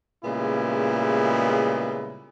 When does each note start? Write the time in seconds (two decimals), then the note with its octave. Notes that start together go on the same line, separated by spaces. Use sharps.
0.24 A#2 C#3 G3 G#3 B3 E4